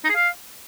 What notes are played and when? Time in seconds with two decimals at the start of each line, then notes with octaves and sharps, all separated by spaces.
0.04 D#4
0.10 G#4
0.15 F5